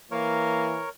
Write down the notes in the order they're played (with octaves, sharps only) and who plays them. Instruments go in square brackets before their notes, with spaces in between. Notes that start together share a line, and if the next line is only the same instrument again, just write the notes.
[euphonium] E3 [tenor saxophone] A#3 [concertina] A#4 C#5